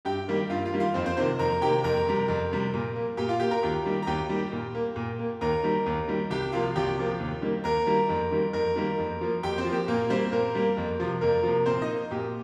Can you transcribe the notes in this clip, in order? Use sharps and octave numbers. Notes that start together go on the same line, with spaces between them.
G2 G4 G5
D#3 G3 A#3
G2 F4 F5
F4 F5
D#3 G3 A#3
F4 F5
F2 C4 C5
C4 C5
C3 D#3 A#3 C4 C5
F2 A#4 A#5
C3 D#3 A#3 G4 G5
F2 A#4 A#5
C3 G3
F2
C3 G3
A#2
A#3
A#2 G4 G5
F4 F5
A#3 G4 G5
A#4 A#5
D#2 G4 G5
D#3 G3
A#5
D#2 G4 G5
D#3 G3
A#2
A#3
A#2
A#3
D#2 A#4 A#5
D#3 G3
D#2
D#3 G3
C2 G4 G5
C3 F3 A#3 F4 F5
C2 G4 G5
C3 F3 A#3
D#2
D#3 G3 A#3
D#2 A#4 A#5
D#3 G3 A#3
F2
D#3 G3 A#3
F2 A#4 A#5
D#3 G3 A#3
F2
F3 A#3
F2 G4 G5
C4 C5
F3
A#3 G4
A#2 A#3 A#4
G3 A#3 C4 C5
A#2 A#3 A#4
G3 A#3
F2
C3 F3
F2 A#3 A#4
C3 F3
A#2 C4 C5
D#4 D#5
A#3
A#2 G4